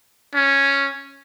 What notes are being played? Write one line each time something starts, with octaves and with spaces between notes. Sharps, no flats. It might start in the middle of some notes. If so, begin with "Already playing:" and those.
C#4